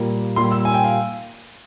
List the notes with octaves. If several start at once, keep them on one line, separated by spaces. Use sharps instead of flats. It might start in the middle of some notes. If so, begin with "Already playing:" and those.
Already playing: A#2 G3 A#3
A#2 G3 A#3 C6
E6
G#5
G5
F5